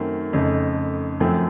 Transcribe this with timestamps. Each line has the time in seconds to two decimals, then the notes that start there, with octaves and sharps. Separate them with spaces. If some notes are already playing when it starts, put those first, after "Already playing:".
Already playing: F#2 D#3 A3 C4
0.33 F2 C#3 A3 D#4
1.20 F#2 F3 A3 C4